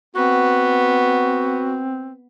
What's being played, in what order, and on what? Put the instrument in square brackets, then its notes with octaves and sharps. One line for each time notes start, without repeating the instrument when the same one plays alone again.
[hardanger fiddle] B3 [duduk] C4 [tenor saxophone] F#4